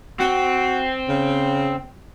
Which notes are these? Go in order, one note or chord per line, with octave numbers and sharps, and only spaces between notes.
C4 F#4
C#3